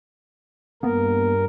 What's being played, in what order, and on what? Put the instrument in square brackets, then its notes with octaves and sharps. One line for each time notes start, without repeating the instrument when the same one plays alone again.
[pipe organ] G2 A#4 [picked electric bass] A#3 B3